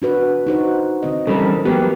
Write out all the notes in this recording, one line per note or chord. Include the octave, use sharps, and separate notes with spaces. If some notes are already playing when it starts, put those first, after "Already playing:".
D4 F#4 B4
D#4 F#4 C5
D#3 C4 D#5
C#3 G3 C4 A4 A#4
E3
F#3 A#3 B3 G4